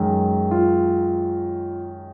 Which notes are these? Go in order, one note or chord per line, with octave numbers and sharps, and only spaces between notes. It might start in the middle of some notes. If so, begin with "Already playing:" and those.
Already playing: F#2 D#3 G#3
F4